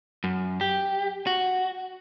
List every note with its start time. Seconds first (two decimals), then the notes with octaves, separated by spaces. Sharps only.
0.24 F#2
0.61 G4
1.27 F#4